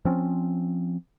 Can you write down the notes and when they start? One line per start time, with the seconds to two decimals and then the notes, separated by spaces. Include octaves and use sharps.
0.05 F3 C4 C#4